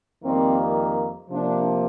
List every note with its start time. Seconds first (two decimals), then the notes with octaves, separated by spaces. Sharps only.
0.24 F2 D#3 G3 A#3 C4
1.30 C3 F3 A#3 D4